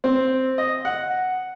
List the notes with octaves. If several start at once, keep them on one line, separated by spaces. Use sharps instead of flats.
C4
D#5
F#5